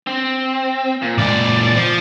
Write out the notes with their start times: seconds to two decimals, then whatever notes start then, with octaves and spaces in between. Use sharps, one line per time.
0.07 C4
1.02 A#2
1.18 C#2 A#2 D5
1.76 F3